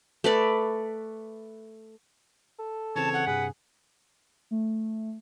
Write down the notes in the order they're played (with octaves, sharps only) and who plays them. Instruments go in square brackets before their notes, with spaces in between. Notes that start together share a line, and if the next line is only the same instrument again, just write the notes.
[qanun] A3 B4 D5
[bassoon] A4
[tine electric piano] C#3 E3 C4 [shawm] C#5 [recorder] A5
[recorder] F#5
[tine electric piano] G2 C3 [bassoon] G#4 [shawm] B4
[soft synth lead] A3